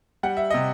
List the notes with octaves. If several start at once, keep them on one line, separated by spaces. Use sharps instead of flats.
G3 F#5
E5
C3 D#5